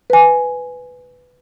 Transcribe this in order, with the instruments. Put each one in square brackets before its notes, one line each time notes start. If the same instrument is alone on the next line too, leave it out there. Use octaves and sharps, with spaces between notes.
[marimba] B4 G#5